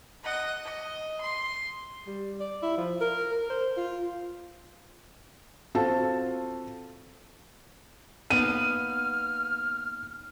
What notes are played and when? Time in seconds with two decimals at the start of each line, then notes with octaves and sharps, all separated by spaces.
0.23 D#5 F#5
0.64 D#5
1.21 C6
2.07 G3
2.40 D5
2.63 E4
2.78 F3
3.01 A#4
3.32 A#4
3.50 C5
3.77 F4
5.75 C4 F4 F#4 A4 C5 A5
8.30 A#3 B3 D#4 F6 D#7